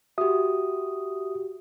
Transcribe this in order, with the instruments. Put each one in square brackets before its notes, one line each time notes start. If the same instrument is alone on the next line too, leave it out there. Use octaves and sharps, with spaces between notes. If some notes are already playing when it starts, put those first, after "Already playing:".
[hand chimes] F#4 G4 [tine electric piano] E5 D#6